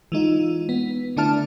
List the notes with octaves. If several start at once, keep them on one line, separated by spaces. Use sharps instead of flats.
E3 G#3 D#4 F4
B3
D3 A3 D4 E4 A5 F6